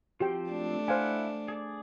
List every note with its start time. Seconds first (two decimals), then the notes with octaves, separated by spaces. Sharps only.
0.20 F3 C4 F#4 G4 C5 G5
0.51 A3 D4
0.88 E4 C5 F5 F#5 G#5
1.48 G#4 D5